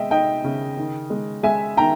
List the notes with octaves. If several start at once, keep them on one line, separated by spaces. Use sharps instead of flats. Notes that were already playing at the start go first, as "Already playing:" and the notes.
Already playing: G#3 D#5 E5 G5
D#4 D#5 G5
C#3
D#3
G#3
G#3 E5 G#5
D#3 G5 A#5